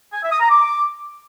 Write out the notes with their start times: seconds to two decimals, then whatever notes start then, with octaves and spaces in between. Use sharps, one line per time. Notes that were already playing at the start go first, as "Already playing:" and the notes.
0.13 G#5
0.22 E5
0.31 D#6
0.40 A#5
0.49 D6